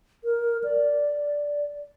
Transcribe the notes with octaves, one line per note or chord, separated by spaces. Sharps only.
A#4
D5